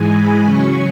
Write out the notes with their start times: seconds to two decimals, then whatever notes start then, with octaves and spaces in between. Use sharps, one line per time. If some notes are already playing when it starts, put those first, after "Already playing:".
Already playing: G#2 E3 G#3 G#5
0.16 B5
0.43 C#3 F#3 C#4 C#6